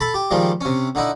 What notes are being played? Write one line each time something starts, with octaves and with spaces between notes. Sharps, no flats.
A4 A5 B5
G4
D#3 F3 G3 G#3
C3 C#4
D3 D#4 E4